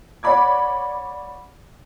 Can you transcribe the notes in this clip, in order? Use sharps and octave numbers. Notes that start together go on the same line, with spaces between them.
C#5 D5 F#5 B5 D6 G#6